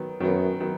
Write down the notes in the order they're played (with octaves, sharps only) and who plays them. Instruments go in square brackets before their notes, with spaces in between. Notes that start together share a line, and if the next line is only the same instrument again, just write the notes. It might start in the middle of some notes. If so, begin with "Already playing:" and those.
Already playing: [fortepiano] D#3 F#3 B3
[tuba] F#2 [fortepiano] D#3 F#3 B3
[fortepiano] D#3 F#3 B3